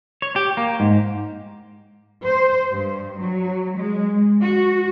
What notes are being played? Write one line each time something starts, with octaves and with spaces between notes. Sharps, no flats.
C#5
G4
A#3
G#2
C5
G2
F#3
G#3
F#4